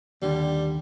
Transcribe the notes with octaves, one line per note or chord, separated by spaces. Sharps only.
D#2 D3 G3